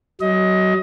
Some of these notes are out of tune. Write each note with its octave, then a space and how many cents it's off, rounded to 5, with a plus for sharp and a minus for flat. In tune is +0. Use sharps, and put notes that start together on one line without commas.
F#3 +20 D#5 +25